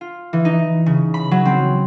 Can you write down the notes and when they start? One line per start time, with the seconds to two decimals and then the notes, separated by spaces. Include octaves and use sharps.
0.01 F4
0.33 E3
0.45 D#4
0.86 C#3
1.14 B5
1.31 F#3
1.45 C4